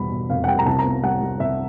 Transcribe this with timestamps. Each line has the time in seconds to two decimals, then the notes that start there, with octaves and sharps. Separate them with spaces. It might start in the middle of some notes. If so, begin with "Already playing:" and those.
Already playing: E2 B2 G3 B5
0.11 B2
0.30 F1 F5
0.44 F#5
0.48 G3 G5
0.59 A#5
0.66 C2 A5
0.79 A#5
0.85 B3
1.03 G3 F#5
1.21 G3
1.40 C2 E5